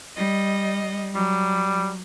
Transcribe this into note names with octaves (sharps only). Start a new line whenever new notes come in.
G3 D#5
F#3 G3